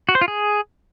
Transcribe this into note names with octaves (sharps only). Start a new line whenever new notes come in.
F#4
C5
F4
G#4